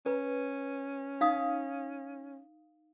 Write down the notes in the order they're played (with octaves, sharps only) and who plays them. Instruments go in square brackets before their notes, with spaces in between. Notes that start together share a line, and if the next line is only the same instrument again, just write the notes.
[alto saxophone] C#4 [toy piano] B4
[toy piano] D#4 F5 D#6